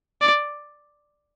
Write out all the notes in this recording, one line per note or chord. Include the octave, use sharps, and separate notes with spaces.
D5